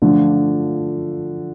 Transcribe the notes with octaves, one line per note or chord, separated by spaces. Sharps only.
D3 F3 A3 F4